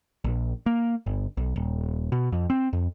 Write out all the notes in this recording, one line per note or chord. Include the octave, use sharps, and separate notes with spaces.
A#1
A#3
G1
B1
D#1
B2
F2
C4
F2